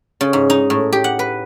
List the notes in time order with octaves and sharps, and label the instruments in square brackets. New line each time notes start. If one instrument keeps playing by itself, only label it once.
[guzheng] C#3
G#2
D#4
A2
G4
F#5
B4